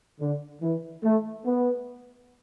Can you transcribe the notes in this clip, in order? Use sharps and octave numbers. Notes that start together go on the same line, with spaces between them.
D3
E3
A3
B3